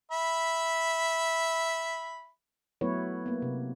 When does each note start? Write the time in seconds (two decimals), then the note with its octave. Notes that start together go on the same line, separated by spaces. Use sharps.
0.11 E5 B5
2.81 F#3 A3 B3 E4 B4 C#5
3.26 A#3 B3
3.42 C3